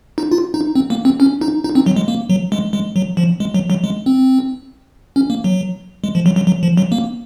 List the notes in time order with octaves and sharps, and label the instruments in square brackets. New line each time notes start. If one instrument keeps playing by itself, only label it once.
[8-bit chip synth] D#4
F4
D#4
C4
A#3
C4
C#4
D#4
D#4
C4
F#3
G#3
A#3
F#3
G#3
G#3
F#3
F3
G#3
F#3
F#3
G#3
C4
C#4
A#3
F#3
G#3
F3
F#3
F#3
F#3
F3
F#3
A#3